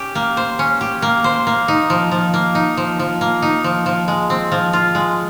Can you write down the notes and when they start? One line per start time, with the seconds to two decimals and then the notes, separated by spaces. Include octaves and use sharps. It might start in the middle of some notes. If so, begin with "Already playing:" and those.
Already playing: C#4 G4
0.15 A#3
0.37 C5
0.59 C#4
0.81 G4
1.02 A#3
1.24 C5
1.47 A#3
1.68 D#4
1.90 F3
2.12 F3
2.34 A#3
2.55 D#4
2.77 F3
2.99 F3
3.21 A#3
3.42 D#4
3.64 F3
3.86 F3
4.08 G#3
4.30 C4
4.52 F3
4.73 F4
4.95 G#3